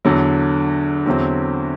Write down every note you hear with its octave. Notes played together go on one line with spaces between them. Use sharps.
E2 D3 F#3
E2 D3 F#3 C4